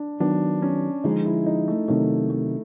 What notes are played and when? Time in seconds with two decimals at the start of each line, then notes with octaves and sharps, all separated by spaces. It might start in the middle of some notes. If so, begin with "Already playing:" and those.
Already playing: D4
0.20 D#3 F#3 B3 D4
0.62 C#4
1.04 D3 F3 G#3 D#4
1.25 E4
1.46 D#4
1.68 A3
1.88 C3 D#3 F#3 A3
2.30 A3